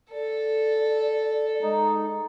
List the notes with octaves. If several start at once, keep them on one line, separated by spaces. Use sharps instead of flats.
A4 D5
G#3 D#4